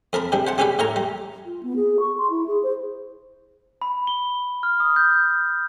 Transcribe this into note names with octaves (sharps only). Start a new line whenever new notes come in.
F2 A#4 A5 B5
C3 G3 D4
C5 F#5 A5
G3 C#4 G4 G#4 B4 D5
A2 A#4 C#5 A#5
G3
F4
B3
G#4
C#6
C6
E4
G#4
C5
B5
G7
F6
D#6
G6